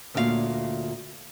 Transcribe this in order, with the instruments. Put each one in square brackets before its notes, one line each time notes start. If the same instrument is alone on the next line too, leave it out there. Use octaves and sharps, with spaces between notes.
[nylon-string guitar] D2 A#2 C#4 E4 F5